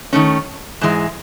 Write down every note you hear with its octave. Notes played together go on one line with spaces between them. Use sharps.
D#3 A3 C#4
G#2 E3 G#3